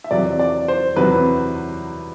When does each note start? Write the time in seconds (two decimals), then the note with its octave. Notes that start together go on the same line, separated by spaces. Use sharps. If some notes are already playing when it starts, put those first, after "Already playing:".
0.04 E5
0.11 E2 C3 F#3 D5
0.39 D5
0.68 C5
0.96 E2 C3 F#3 B4